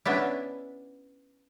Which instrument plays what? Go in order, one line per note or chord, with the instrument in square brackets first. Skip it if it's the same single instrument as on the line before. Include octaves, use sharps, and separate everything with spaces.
[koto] B3 C#4 D4 E4